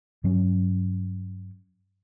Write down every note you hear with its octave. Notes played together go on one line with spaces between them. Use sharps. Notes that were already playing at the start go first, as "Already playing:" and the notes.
G2 F#3 C#4